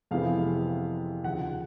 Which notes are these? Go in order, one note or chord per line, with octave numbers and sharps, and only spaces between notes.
F2 C3 E3 G#3 B3 F5
D#2 C#3 F3 F#5